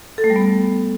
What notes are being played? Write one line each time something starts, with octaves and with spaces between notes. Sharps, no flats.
A4
A3
G3
B3